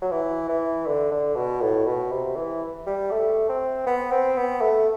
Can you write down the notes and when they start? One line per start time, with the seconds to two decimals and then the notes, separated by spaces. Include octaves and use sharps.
0.02 F#3
0.11 E3
0.49 E3
0.87 D3
1.11 D3
1.36 B2
1.61 A2
1.86 B2
2.11 C3
2.36 E3
2.86 G3
3.11 A3
3.49 C4
3.86 B3
4.11 C4
4.37 B3
4.61 A3